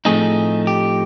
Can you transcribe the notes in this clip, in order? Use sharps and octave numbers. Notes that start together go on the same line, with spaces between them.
A2 F3 A3 C4 D#4 G#4
G4